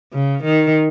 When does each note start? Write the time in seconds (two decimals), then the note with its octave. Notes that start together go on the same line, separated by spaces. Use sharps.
0.13 C#3
0.44 D#3